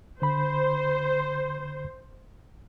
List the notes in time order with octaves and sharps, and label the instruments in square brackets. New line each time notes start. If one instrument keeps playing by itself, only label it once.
[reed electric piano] D3 B5 [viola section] C5